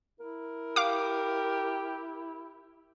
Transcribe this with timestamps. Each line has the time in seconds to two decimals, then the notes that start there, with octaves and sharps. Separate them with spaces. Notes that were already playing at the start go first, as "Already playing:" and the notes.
0.20 E4 A#4
0.76 G4 F5 D6